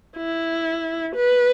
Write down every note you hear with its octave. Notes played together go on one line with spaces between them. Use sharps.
E4
B4